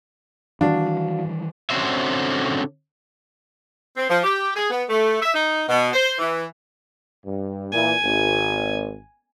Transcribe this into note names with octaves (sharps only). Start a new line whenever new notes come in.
D#3 E3 G3 D4 F#4 D5 F5
D3 C4 C#4 F#4 C5 E5
C4
F3
G4
G#4
B3
A3
E5
D#4
B2
C5
E3
G2
A#2 E3 G#5
G#1